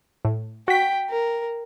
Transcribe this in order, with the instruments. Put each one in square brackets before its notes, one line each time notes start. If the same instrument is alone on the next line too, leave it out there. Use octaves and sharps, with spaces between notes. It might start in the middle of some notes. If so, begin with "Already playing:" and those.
[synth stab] A2
[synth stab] F#4 B6 [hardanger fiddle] G5
[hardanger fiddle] A#4